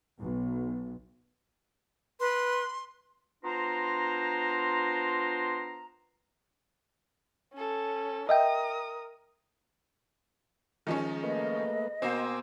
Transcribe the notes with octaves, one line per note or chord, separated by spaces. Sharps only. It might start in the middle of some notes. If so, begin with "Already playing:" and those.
B1
B4 C6
B3 D4 F4 A#4 C5 A#5
C#4 A4
A#4 D#5 E5 G5 D#6
D#3 F3 G#3 C#4
A3 A#3 B4 D#5
B2 A#3 C4 C5 G#5 D6 E6